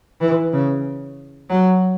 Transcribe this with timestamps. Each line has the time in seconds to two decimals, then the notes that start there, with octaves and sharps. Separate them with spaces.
0.21 E3
0.53 C#3
1.50 F#3